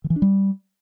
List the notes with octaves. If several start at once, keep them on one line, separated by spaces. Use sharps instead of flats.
D#3
E3
D4
G3